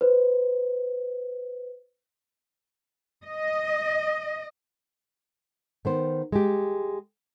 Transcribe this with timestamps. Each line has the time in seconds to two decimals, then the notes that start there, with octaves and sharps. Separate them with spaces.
0.01 B4 C5
3.24 D#5
5.85 D#3 B3 C5
6.32 G#3 G4